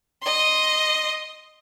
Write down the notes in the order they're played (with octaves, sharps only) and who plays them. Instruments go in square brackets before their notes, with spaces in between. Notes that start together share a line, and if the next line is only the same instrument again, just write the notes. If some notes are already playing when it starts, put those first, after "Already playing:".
[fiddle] D#5 C6